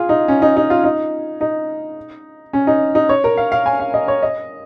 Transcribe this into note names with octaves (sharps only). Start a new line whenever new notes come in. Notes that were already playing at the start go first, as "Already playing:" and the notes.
Already playing: F4 G#4
D#4
C#4
D#4
D#4
F4
D#4
D#4
C#4
D#4
D#4
C#5
A#4
F5
F5
G#5
F5
D#5
C#5
D#5